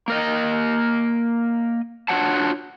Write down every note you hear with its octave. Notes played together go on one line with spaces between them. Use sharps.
A#3 A#4 D#5
D4 F4 F#4 C#5 F#5 A5